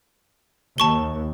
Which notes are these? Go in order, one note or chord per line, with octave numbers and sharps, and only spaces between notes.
D#2 A5 C#6 G7